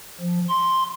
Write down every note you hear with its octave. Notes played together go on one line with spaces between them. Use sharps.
F3
C6